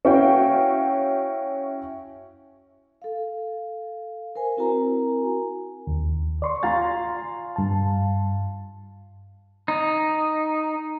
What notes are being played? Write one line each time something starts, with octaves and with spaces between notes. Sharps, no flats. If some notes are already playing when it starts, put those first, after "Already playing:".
C#4 E4 F#4 F5 G5
A4 F5
A#4 C5 G#5
C4 E4 F#4 A#4 G#5 A#5
D#2
D5 C6 C#6
F4 F5 G#5 A#5 C6 A6
G2 A5
D#4